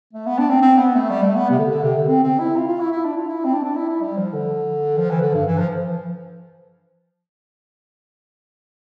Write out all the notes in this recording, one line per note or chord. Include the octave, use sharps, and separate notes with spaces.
A3
B3
D4
C4
C4
B3
A3
G3
A3
B3
C3
D3
D3
C3
D3
C4
C4
E4
F4
F4
E4
E4
D4
F4
E4
C4
D4
D4
E4
E4
G3
F3
D3
F3
E3
D3
G2
E3
F3